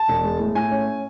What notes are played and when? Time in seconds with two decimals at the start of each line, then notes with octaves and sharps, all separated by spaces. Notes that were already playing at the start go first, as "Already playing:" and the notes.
Already playing: A5
0.08 E1
0.24 G#3
0.40 A2
0.55 A2 G#5
0.71 C#4